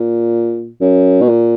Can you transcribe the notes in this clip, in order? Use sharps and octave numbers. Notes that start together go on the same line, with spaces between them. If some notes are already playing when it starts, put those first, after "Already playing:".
Already playing: A#2
F#2
B2
A#2